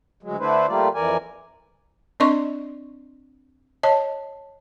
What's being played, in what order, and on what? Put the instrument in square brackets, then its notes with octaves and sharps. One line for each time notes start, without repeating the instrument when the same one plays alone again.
[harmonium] D2 F#3 G#3
D3 A3 D4 E4 B4 C5
G3 A3 A#3 F4 D5
F2 E3 A#4 D5 G#5
[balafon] C4 D4 D5 D#5 C6 C#6
C#5 D#5 A5